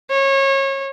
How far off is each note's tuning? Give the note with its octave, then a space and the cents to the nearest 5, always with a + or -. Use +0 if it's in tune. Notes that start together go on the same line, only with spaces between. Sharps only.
C#5 -25